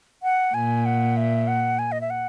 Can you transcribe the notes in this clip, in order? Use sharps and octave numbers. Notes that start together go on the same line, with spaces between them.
F#5
A#2 G#5
F#5
E5
F#5
G#5
D#5
E5
F#5